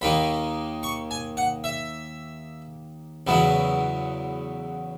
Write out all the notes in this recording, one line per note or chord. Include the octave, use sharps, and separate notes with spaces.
D#2 D#3 A#3 D#4 B5
C#6
G#5
F#5
E5
E2 C#3 F#3 B3 E4